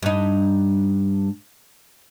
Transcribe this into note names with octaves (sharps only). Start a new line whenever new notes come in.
G2 D#4